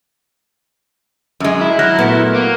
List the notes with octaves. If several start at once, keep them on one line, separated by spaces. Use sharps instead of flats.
F#2 G#3
E4
F#3 F6 F#6 A#6
A#2 A3 B3
A#3